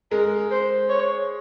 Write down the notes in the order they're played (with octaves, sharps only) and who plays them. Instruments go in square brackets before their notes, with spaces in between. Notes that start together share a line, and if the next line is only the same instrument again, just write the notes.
[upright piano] G#3 [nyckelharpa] A#4
[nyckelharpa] C5
C#5